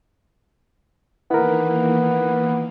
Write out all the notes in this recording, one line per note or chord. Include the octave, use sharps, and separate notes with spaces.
D#3 E3 A#3 B3 E4 A#4